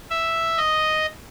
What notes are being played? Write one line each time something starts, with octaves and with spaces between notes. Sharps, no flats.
E5
D#5